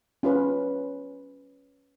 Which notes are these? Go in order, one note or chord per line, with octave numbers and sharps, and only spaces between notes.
C#4 F4 B4